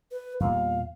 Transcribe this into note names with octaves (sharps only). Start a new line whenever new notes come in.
B4
E2 A#2 G3 F5